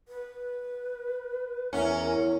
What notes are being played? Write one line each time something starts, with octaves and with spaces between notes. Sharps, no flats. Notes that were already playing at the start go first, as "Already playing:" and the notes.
B4
E2 C#4 A#4